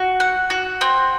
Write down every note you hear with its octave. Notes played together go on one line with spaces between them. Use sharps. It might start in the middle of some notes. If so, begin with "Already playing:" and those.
Already playing: F#4
F#5
F#4
C4